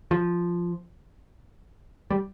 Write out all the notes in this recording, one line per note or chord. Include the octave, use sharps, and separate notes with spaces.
F3
G3